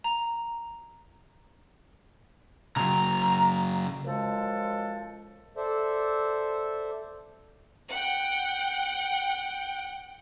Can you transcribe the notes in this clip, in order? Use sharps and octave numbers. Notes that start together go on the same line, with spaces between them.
A#5
C#3 F#3 A#5
F#2 F3 G#3 A4
A4 C5 D5 E5
F#5 G5